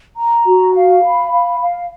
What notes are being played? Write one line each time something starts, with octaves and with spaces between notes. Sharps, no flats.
A#5
F#4
F5
B5
F5
F5